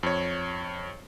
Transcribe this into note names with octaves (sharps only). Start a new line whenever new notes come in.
F2 C#5